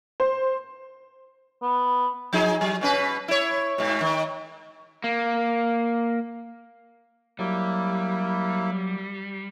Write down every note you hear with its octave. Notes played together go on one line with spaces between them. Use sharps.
C5
B3
F3 D#4 G#4
F#3
B2 C#4 B4
E4 C#5
G#2 B2
D#3
A#3
F#3 G3 A#3 E4